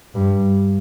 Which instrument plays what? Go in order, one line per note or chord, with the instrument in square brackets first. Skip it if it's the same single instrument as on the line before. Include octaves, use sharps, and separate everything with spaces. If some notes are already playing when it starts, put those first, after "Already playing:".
[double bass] G2